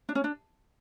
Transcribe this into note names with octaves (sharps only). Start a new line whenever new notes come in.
D4
C#4
D4